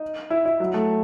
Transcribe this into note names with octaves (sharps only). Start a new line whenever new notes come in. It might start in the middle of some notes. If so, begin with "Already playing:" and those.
Already playing: D#4
E4
E4
F#3
A3